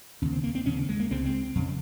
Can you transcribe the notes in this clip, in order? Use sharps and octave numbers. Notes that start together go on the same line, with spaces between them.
D#2 C#3 C#4
C4
A#3
C4
D#2 C#3 C#4
G#3
A#3
C#2 C#3 C4
C4
F2 C#3